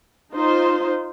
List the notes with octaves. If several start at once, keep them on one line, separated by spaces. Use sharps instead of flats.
D#4 F4 C5